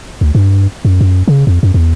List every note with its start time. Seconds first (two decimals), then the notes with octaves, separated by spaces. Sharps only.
0.21 D2
0.35 G2
0.85 F#2
1.01 F#2
1.28 C#3
1.47 F2
1.63 F#2
1.74 E2